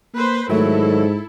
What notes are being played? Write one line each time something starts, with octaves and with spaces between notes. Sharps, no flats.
A#3 B4 C5
G#2 D#3 F#3 A3 E4 A4